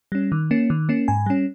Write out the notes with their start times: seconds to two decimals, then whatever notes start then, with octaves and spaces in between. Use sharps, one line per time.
0.12 G3 C#4
0.32 D#3
0.51 A#3 C#4
0.70 D#3
0.89 A#3 C#4
1.08 G#2 G#5
1.26 G3 C#4